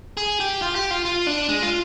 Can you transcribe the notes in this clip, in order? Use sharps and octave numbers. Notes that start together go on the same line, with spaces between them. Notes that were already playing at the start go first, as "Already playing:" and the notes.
G#4
G4
F4
G4
F4
F4
D4
G#3
F4